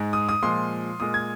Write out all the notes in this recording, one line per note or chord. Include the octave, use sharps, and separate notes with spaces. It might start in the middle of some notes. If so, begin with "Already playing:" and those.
Already playing: G#2 G#3
D#6
D#6
A#2 F3 G#3 C6
A#2 G#3 D#6
G#6